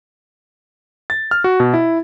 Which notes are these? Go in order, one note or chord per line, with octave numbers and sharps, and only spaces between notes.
A6
F6
F#4
B2
E4